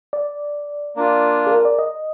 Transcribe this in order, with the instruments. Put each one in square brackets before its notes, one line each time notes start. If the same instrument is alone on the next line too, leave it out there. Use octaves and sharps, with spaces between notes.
[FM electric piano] D5
[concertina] A#3 D4 F4
[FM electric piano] G#4
A#4
D5
D#5